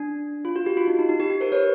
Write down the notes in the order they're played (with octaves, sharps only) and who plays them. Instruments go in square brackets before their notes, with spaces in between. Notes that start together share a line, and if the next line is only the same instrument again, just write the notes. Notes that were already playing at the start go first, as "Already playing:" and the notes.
Already playing: [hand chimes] D4
F4
F#4
G4
F4
D#4
D#4
D#4
G4
G4
A#4 C5
B4 C#5